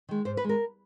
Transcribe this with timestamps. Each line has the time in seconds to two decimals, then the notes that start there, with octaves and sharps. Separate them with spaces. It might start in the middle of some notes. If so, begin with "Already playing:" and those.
0.09 D#3 G#3
0.25 G#2 C5
0.37 B4
0.44 D#3 G#3
0.49 A#4